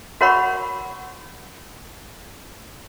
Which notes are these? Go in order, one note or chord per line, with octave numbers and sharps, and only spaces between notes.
F#4 A#4 C#5 F#5 B5 C#6